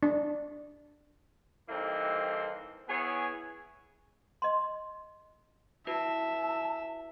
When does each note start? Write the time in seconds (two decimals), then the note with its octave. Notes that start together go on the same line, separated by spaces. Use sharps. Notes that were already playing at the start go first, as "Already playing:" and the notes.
0.03 D4
1.69 E3 G3 A#3 C4 D#4 A4
2.89 B3 E4 G#4 C#5 G#5
4.42 D#5 C6
5.87 E4 F#4 B4 E5 A5